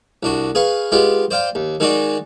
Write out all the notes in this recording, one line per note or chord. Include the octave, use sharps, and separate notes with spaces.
C2 D4 F#4
G#4 B4 F5 C#6
G#3 B3 F4 G4
C5 D5 F5 G5
D#2
D#3 G#3 D#4 F#4 G#4 D5